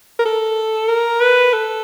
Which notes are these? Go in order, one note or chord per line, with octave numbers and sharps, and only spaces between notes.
A#4
A4
A#4
B4
A4